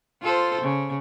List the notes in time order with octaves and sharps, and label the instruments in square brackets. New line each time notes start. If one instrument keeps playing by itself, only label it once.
[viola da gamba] F4 A4 C5
C#3